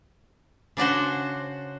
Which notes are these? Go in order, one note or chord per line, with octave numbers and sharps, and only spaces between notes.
C#3 D4 F#4 C5